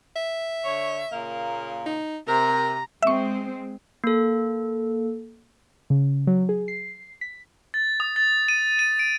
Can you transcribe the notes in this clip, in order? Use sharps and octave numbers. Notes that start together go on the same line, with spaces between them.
E5
D3 C#5
A#2 C#3 A#3
D#4
C3 A#4 A#5
G#3 C4 E5 C#6
A#3 A4
C#3
F#3
G#4
C7
B6
A6
D#6
A6
D#7
D#7
D7